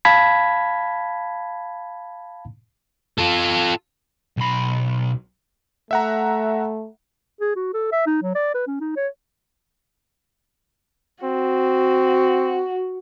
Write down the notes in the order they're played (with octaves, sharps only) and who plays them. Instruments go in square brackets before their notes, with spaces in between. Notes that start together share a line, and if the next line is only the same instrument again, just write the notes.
[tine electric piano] F5 A5 B5 G#6 B6
[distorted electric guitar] F4 A4
B1 B5
[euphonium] A3 [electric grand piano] E5 F#5 A#5
[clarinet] G#4
F#4
A4
E5
D#4
F#3
D5
B4
C#4
D#4
C#5
[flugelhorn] C4 [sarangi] F#4